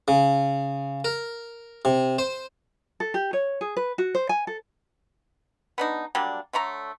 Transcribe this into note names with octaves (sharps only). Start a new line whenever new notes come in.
C#3
A#4
C3
C5
A4
G4
C#5
G#4
B4
F#4
C5
G#5
A4
B3 D4 D#4
F#3 G3 A#3 D4
D3 A3 C#5 A#5